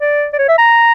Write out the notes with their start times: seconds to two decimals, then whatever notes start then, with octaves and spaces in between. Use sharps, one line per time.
0.01 D5
0.33 D5
0.39 C#5
0.49 E5
0.58 A#5